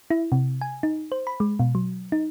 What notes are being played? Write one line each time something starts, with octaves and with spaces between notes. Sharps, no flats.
E4
C3
G#5
D#4
C5
B5
G#3
B2
F#3
D#4